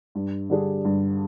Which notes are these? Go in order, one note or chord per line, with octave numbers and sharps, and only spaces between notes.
G2
D3 G3 D4 G#4
G2